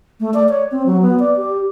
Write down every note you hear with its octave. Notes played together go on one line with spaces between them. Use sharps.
A3
D5
C#5
C4
F#3
B3
D5
G4